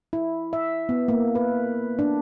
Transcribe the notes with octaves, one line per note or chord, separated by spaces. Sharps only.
E4
E5
B3
A#3
B4
D4